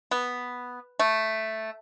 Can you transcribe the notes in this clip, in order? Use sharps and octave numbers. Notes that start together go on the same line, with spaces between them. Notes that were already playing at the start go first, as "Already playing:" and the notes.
B3
A3